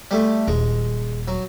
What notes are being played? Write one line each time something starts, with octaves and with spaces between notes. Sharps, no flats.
G3 A3
D#1 G#3
F#3